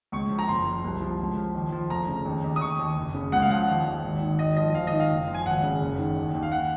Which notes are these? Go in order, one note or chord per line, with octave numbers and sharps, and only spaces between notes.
C#2 C#6
F3
A#5
F#1 C6
F3
C2
F3
C#2
F3
D#2
F3
F1 A#5
C#3
D#2
D#2
D#6
D#2 C#6
D#2
F#1
C#3
C#2 F#5
F5
F3 F#5
D#2
D#2
G#1
D#3
G#1 D#5
F3 D#5
G#1 F5
D#5
D#3
F5
F#1
F3
G#5
G#1 F#5
C#3
F#1
D#3
D#2
D#2
F5
F#5